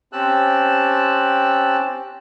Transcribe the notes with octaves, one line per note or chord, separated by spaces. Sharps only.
C4 C#4 G4 A5 E6 F#6